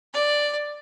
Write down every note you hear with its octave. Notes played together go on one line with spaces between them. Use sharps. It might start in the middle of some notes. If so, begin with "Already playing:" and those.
D5